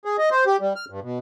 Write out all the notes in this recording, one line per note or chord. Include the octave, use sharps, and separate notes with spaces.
G#4
D#5
C5
G4
G3
F6
G2
B2